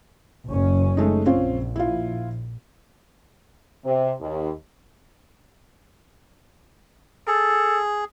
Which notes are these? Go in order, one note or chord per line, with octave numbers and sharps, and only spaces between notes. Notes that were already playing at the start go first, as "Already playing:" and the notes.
F#1 C#4
G#3 A3 D#4
A#1 C4 C#4 F4
E4 F4
C3
D#2
G#4 A4